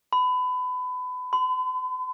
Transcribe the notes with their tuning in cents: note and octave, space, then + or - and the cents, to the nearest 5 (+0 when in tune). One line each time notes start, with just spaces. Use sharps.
B5 +25
B5 +45